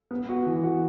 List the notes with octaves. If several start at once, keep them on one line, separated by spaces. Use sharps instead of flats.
B3
F#4
E3
F#4